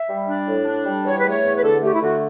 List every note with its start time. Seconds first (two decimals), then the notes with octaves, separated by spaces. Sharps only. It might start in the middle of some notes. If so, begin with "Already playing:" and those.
Already playing: E5
0.09 G3
0.28 D4
0.47 A2
0.67 D4
0.85 G3
1.05 E2 C#5
1.18 B4
1.25 A3 C#5
1.44 E2
1.55 B4
1.62 D3 A4
1.82 A3 G4
1.93 E4
2.01 D3 F#4